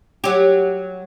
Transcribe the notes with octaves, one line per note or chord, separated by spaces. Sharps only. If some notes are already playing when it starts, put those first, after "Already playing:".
F#3 G4